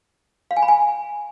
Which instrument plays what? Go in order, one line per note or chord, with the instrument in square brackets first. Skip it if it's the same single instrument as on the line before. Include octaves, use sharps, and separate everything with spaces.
[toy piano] F5
G#5
B5
G#5